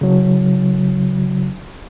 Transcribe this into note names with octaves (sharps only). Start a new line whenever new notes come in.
C#3 F#3